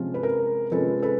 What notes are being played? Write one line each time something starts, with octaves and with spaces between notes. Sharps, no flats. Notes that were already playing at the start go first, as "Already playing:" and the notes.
Already playing: C3 F3 G#3 C#4 F4
B4
A#4
C3 F3 G#3 C#4 F4 A4 B4
A4 B4